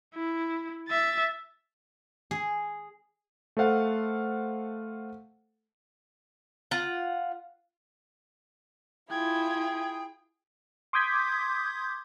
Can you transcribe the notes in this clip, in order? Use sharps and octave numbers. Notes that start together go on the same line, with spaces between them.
E4
E5 A6
G#4
A3 A4 C5 F5 F#5
F4 F#5
E4 F4 G#4 G5 G#6
C6 D6 D#6 G6 G#6 B6